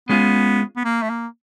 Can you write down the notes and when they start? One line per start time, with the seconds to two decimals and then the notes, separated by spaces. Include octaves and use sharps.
0.09 G#3 B3 C#4 F4
0.76 B3
0.84 A#3
1.02 A3
1.09 A#3